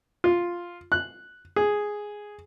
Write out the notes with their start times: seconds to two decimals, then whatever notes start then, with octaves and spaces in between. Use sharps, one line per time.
0.24 F4
0.92 F#6
1.56 G#4